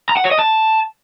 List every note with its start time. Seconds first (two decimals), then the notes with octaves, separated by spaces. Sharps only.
0.09 A#5
0.17 F#5
0.24 C#5
0.31 D#5
0.39 A5